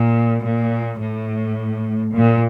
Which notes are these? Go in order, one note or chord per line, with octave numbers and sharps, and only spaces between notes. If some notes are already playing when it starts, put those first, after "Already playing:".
Already playing: A#2
A#2
A2
A#2